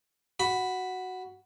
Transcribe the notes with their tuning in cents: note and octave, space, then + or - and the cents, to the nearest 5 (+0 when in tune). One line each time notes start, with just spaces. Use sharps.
F#4 +0 B5 +5